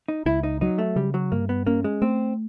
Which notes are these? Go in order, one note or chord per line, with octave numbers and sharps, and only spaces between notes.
D#4
C#2 E4
D#4
F#3 D#4
A3
C#3 G3
F#3
G2 A#3
B3
A#3 C#4
G#3
A3 C4